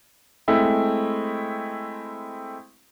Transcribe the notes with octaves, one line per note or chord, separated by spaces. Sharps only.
G#3 A3 C4 E4